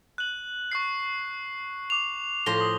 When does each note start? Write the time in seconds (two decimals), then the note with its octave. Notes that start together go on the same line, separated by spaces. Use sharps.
0.18 F#6 F#7
0.72 C#6 F#6 C7
1.90 D6 F7
2.46 A2 F3 C5 A#6 G7
2.61 D#6